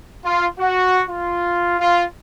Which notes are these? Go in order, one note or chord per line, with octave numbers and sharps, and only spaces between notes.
F4
F#4
F4
F4